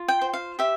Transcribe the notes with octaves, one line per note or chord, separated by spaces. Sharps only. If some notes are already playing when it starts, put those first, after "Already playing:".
Already playing: F4
G5
C5
F5
G4 E5